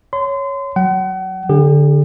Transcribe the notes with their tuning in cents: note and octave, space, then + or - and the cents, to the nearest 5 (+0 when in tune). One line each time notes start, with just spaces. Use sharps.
C#5 +0 C6 -30
F#3 +0 F#5 +35
D3 -5 G4 +40